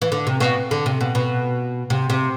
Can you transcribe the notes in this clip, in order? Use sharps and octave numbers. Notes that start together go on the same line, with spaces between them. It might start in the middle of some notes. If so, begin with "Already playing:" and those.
E3
D3
C3
B2
D3
C3
B2
B2
C3
C3